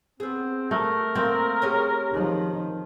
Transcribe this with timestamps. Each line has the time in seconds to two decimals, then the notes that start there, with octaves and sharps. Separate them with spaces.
0.20 B3 C4 G#4
0.71 A3 A#4
1.15 A#3 C4
1.62 C#4 G4 G#4
2.11 D#3 F3